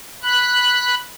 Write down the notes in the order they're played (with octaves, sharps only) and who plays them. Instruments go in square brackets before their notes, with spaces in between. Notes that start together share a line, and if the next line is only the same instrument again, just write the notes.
[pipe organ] B5 F#6